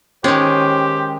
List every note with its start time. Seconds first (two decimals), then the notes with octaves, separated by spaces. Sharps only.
0.24 D#3 G#3 C#4 G4 C5